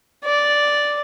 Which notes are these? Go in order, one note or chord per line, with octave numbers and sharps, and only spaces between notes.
D5